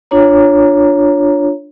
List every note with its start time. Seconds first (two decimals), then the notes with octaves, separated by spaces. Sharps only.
0.11 D4 F4 C#5 A#5